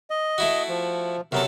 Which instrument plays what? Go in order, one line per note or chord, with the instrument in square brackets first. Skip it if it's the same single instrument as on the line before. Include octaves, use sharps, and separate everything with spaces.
[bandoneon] D#5
[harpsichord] A3 E4 F#4
[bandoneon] F3
[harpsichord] C3 F#3 A4 [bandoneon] B3 F#4 A#4